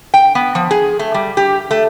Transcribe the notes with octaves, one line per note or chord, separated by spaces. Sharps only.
G5
B3
F3
G#4
A3
G3
G4
A3